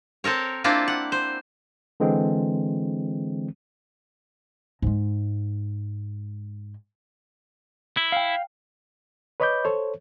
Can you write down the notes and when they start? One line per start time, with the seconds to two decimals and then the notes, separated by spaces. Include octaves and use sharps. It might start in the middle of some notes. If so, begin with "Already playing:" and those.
0.24 C4 A4 A#4 C#5
0.64 A#3 C4 D4 E4 F4
0.88 F#5
1.12 C5
2.00 D3 E3 G#3 C4
4.82 G#2 G#3
7.97 E4
8.12 F5 G5
9.40 B4 C#5 D#5 B5 D6 G6
9.64 A4 C5 C#5